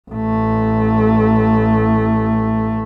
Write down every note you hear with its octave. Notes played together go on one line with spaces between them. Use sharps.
A1 A3